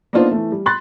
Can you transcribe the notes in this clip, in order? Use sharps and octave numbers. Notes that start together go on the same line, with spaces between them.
A#3 B3 D4 D#4 F4 C5
E3 A3
G3
B5 C6 F#6 A6